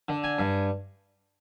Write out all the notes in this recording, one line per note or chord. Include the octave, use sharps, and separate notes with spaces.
D3
G#5
G2